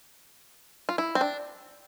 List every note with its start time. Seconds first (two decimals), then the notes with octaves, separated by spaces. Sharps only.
0.89 F4
0.98 E4
1.15 C4
1.21 D4